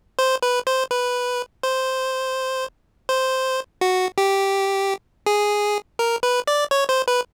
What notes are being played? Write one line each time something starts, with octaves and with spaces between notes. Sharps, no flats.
C5
B4
C5
B4
C5
C5
F#4
G4
G#4
A#4
B4
D5
C#5
C5
B4